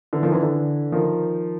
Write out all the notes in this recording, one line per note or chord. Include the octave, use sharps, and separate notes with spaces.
D3 E3
D#3 F3
D3 E3
D3 E3
D#3 F3